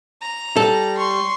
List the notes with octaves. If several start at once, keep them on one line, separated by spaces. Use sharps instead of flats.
A#5
G3 A4
C6 C#6